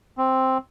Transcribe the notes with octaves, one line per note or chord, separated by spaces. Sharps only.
C4